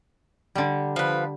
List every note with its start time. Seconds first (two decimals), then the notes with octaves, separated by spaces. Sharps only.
0.55 D3 G3
0.96 F3 B4